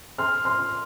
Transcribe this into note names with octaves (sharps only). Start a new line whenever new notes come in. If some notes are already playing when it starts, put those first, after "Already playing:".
C6 F6
C6 F6